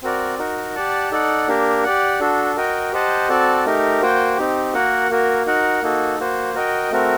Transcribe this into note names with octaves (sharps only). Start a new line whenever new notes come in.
C4 F#4 A#4 D5
D#4 F#4 A#4
G4 D5 F#5 A5
D#4 A4 D5 F#5
A#3 D4 G4 A#4
G4 D5 F#5
D4 F#4 A4
F#4 A#4 D#5 G5
G4 C5 D#5 F#5 A5
C4 F#4 A4 D5 A5
A3 D#4 G4 A#4
A#3 F#4 C5 G5
C4 D#4 G4
A#3 F#4 A#4 F#5
A#3 F#4 A#4
D#4 F#4 A#4 F#5
A#3 D#4 F#4 A4
A#3 F#4 C5
F#4 A#4 D#5 G5
A3 C4 F#4 A#4